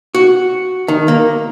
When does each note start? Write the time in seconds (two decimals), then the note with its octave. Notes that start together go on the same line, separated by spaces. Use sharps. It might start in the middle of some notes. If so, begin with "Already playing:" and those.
0.15 F#4
0.88 D#3
1.08 A#3